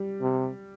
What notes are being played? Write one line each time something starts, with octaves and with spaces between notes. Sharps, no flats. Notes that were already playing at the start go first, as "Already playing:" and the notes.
Already playing: G3
C3